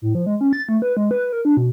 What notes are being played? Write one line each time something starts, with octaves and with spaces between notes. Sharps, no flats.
A2
F3
G#3
C#4
A6
A3
B4
G#3
B4
A#4
D4
B2